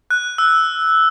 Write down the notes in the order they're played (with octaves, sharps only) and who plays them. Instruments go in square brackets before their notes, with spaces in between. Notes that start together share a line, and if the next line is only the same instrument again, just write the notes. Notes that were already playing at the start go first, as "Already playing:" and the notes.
[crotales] F#6
E6